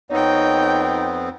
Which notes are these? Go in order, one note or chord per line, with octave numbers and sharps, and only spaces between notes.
F2 B3 C4 D#4 C#5 G5